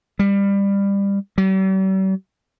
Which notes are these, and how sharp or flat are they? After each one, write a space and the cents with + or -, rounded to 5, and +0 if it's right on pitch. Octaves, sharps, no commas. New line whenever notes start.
G3 +25
G3 -45